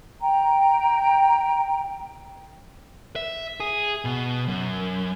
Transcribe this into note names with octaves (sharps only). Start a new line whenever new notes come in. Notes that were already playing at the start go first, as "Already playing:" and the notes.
G5 A#5
E5
G#4
B2
F#2